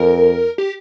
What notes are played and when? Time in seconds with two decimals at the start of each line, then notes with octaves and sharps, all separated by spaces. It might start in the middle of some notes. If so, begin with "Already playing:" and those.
Already playing: F2 A#4
0.58 G4